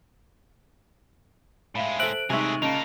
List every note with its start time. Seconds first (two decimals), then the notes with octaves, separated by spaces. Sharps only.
1.75 A2 G#3 E5 F5 B5
2.00 A4 C5 E5 F#6 D7 F#7
2.30 A2 C3 G#3 D#4 G#4 E5 C#6 F7
2.62 A#2 C#3 A#3 D#5 A5 D7 F7